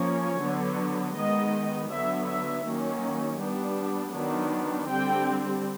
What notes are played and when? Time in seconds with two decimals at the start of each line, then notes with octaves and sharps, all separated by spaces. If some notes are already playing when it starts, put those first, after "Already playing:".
Already playing: F3 A#3 C#4 C#5
0.42 D3 F#3 B3
1.16 D#3 G#3 B3 D#5
1.90 D3 F#3 B3 E5
2.28 E5
2.65 D#3 F#3 A#3 C#4
3.40 G3 B3 D4
4.14 D#3 F#3 B3 D4
4.89 D3 G3 C4 G5